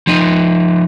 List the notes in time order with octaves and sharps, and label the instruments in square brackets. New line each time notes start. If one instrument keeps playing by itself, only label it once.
[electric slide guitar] F3 D#4